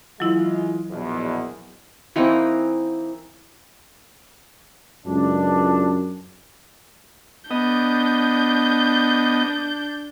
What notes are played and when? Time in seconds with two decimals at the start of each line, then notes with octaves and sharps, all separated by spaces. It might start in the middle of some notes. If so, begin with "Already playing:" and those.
0.20 E3 F#3 G#3 E4 F4
0.90 A#1 E2 B2
2.16 E3 A#3 C4 D#4
5.07 C#2 F#2 D4
7.51 B3 D4 D#5 G6